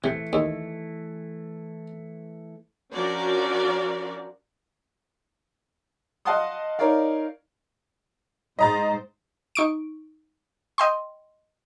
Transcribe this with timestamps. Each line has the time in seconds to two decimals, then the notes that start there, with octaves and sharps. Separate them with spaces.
0.04 C3 E3 A3
0.33 D#2
2.94 F3 C#4 D4 F#4 A#4 D5
6.25 D#5 F5 F#5 A5 C6 D#6
6.79 D#4 A#4 C#5 D5 F5
8.59 G#2 C5 D#5 A#5 A6
9.55 D#4 C#6 D7
10.78 D#5 G5 C6